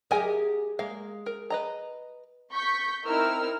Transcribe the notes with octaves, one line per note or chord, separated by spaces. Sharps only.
F#3 G4 G#4 A#4 D#5 G#5
G#3 A#3 F5
A#4
B4 D#5 A#5
C#6 G6 B6
C4 D#4 E4 A#4 E6 F6